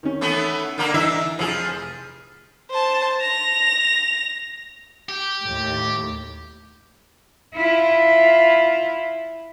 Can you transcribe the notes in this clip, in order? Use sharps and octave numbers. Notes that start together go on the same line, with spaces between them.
D#3 C#4
E3 A3 B3
D3 A#3 A#4
E3 D4 D#4 E5
F1 F3 G#4
C5 A5
A#6 F7
G4
D#2 A2
E4 F4